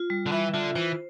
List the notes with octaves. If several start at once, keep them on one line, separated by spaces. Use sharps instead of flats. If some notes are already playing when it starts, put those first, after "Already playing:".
Already playing: F4
G3
D3
E3 E5
D3 F4
E3 C5